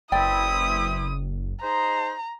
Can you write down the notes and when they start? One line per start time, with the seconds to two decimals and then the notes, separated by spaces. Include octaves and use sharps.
0.12 F#1 E3 C4 E4 D5 G5 D#6
1.63 D#4 G#4 C5 A#5